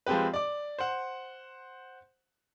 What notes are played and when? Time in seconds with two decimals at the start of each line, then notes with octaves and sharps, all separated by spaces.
0.06 F3 G#3 C4 G4 B4
0.34 D5 D6
0.79 C5 F#5